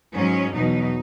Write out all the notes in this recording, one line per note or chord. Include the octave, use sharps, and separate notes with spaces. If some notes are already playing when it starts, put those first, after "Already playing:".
G#2 F#3 C#4
E2 B2 F#3 D#4